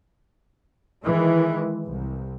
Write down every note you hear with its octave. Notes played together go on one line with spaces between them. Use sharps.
D#3 E3 G#3
C2